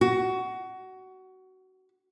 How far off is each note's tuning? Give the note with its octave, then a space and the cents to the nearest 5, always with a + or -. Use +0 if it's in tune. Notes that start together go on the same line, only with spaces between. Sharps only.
F#4 +20